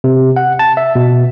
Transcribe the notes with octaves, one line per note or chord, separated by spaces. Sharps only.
C3
F#5
A5
E5
B2